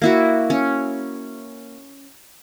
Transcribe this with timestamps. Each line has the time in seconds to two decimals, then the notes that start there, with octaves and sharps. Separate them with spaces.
0.02 A#3 E4 F#4
0.50 C#4